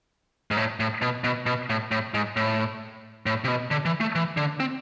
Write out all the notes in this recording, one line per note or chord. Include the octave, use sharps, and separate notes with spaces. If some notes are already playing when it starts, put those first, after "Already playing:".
G#2
A2
A2
B2
B2
B2
A2
A2
G#2
A2
A2
C3
B2
D3
E3
A3
E3
D3
C4